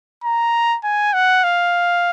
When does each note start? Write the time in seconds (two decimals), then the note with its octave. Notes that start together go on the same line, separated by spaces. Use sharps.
0.24 A#5
0.84 G#5
1.14 F#5
1.44 F5